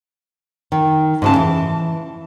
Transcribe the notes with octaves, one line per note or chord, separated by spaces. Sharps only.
D#3
G#2 C#3 A5
E3